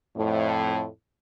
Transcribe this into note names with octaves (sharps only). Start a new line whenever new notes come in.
F2 A2